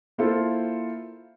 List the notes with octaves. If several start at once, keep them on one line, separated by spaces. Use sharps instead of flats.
A#3 E4 F4 A4 C5